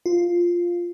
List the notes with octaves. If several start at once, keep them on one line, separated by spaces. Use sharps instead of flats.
F4